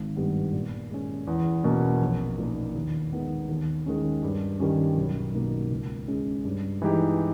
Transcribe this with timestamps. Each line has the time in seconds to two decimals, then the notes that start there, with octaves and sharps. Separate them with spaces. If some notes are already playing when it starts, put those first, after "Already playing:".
Already playing: G#1
0.16 G2 D#3 G3 B3
0.53 A#2
0.90 G#3 C#4
1.27 E2
1.64 B2 A#3 C#4
2.01 A#1
2.38 A#2 A#3 D#4
2.75 D#2
3.12 D#3 G#3 B3 D#4
3.49 D#2
3.86 D#3 G#3 C#4
4.23 G2
4.60 D#3 G3 C#4
4.97 B1
5.34 B2 A#3 D#4
5.71 C#2
6.08 C#3 G#3 C#4
6.45 G2
6.82 E3 G#3 D#4 G4